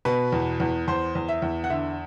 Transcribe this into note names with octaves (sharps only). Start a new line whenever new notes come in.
B2 B4
E2
E2
E2 C5
E2
E5
E2
F#5
D3 E5